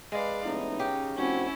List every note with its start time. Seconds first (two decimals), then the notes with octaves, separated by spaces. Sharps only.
0.12 G#3 B4 D5 F5
0.45 F1 B3 C#4 D#4 E4
0.80 C#3 G4
1.18 F1 C4 C#4 E4 F#4